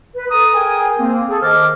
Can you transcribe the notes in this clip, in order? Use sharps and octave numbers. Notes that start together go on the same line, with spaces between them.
B4
A4 A#5 D#6
G#4 A#4 G5 G#5
A#3 C4
G#4 A4
D#3 C5 D#5 D6 F6